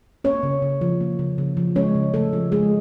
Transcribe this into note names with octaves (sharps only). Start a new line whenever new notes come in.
A#3 C#4 C#5
C#3
C#3
F3
A#3
C#3
C#3
F3
G#3 C#4 C#5
C#3
C#3 A3 A4
F3
G#3 G#4